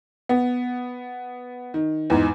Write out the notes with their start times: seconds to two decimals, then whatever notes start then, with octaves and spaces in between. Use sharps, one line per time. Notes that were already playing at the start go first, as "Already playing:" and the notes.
0.29 B3
1.74 D#3
2.10 E2 G#2